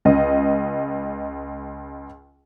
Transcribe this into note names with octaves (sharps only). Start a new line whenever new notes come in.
C#2 D#5